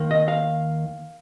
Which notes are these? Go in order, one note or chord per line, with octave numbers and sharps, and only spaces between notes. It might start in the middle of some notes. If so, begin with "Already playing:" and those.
Already playing: D#2 D#3 A#3
D#5
F5